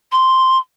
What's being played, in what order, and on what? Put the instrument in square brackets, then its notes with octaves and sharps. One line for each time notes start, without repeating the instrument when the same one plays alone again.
[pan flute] C6